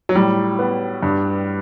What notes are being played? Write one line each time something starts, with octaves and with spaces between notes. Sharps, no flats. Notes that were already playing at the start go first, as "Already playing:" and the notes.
F#3
A2 G3
B3
G2